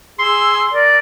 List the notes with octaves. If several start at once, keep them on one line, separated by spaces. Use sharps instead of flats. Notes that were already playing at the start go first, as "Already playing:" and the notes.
G#4 C6 E6
A#4 D5